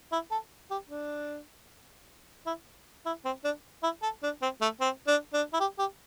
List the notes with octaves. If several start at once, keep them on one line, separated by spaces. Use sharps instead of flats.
E4
A4
G4
D4
E4
E4
C4
D4
E4
A4
D4
C4
A3
C4
D4
D4
E4
G4
G4